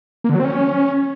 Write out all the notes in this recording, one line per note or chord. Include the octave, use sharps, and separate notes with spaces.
A#3
D3
F#3
C4
C#4